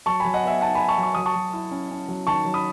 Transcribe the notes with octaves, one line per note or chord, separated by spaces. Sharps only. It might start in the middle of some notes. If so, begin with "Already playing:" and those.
F#3 A5 C#6
F#3 G#5 B5
D#5 F#5
B3 E5 G#5
D#4 F#5 A5
D#4 G#5 B5
A5 C#6
F#3
C#6
F#3 D#6
A5 C#6
F#3
E4
C#4
C#4
F#3
D#3 A5 C#6
F#3
B5 D#6